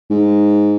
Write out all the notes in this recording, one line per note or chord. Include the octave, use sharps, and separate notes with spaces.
G#2